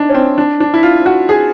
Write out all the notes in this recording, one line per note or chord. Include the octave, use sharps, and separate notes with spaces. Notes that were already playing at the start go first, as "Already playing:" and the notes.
Already playing: D4 D#4
C#4
C4
D4
D4
E4
F4
F#4
G#4